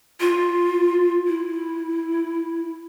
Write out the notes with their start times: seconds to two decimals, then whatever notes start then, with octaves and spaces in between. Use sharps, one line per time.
0.20 F4
1.27 E4